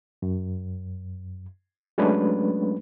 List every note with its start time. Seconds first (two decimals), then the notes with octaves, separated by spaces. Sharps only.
0.22 F#2
1.98 F#3 G#3 A3 C#4 D4 B4